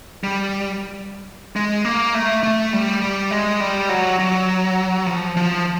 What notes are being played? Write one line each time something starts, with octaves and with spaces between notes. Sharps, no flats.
G3
G#3
A#3
A3
A3
G3
G3
G#3
G3
F#3
F#3
F3
F3